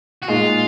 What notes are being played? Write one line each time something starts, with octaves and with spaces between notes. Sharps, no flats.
F#4
A#2 G#3 D#4 F4